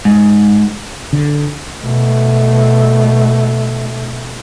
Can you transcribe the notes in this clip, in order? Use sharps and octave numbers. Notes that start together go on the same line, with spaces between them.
G#2
D3
B2 A3